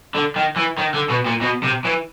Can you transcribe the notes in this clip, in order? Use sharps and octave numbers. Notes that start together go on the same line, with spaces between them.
D3
D#3
E3
D#3
D3
B2
A#2
B2
C3
E3